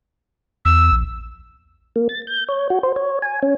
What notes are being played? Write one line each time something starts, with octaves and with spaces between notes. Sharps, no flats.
E2 E6
A#1
A#3
A6
G6
C#5
F#4
C5
C#5
G#5
C#4